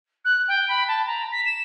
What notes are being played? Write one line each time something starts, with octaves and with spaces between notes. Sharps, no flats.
F#6
G5
B5
A5
A#5
B6
E7